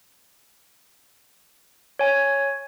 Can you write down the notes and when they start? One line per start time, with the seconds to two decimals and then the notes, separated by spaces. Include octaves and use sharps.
1.99 C#5 G#5